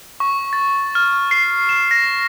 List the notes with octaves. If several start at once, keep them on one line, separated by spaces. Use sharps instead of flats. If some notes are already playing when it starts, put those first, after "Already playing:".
C#6
A6
F6
C7
E7
A#6